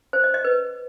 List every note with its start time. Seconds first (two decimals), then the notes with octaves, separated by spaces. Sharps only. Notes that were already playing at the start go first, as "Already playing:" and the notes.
0.13 C5
0.24 D#5
0.34 D#5
0.44 B4